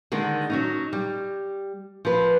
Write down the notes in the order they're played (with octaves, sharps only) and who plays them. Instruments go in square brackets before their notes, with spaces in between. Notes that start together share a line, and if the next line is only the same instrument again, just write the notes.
[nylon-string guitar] D3 D#3 G#3 D#4
F#3 C#4 D#4
G3
F3 B4